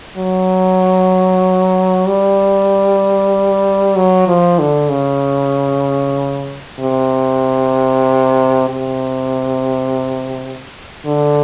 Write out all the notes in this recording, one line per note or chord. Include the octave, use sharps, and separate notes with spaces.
F#3
G3
F#3
F3
D3
C#3
C3
C3
D3